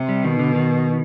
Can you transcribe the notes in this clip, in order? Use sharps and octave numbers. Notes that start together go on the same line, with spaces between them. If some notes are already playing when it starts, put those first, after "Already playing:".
Already playing: C3
G3
B2 D#3
D3
D#3